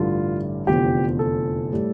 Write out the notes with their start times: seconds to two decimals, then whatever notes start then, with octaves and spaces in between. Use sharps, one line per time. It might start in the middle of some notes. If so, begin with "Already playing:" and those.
Already playing: A1 G2 D3 G3 F4
0.67 F1 E2 D3 F3 G4
1.19 A4
1.72 A2 G3